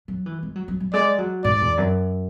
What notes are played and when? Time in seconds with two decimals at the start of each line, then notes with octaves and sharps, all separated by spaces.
0.08 F#3
0.26 E3
0.43 G#3
0.56 F#3
0.68 F#3
0.80 F#3
0.93 G#3 D5
1.18 F#3
1.44 G#2 D5
1.61 E2
1.77 F#2